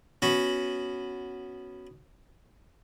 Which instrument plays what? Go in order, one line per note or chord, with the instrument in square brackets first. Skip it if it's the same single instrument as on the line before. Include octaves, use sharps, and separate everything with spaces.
[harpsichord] B3 C#4 F#4